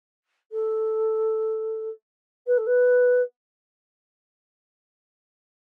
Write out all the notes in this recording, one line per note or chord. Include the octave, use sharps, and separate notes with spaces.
A4
B4
A4
B4